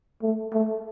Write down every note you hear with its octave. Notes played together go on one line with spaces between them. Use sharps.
A3
A3